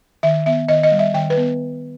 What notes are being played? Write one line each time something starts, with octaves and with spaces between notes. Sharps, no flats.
D#3 E5
B3 E5
D#3 D#5
D#5
G3
E5
D#3 G5
B4
B3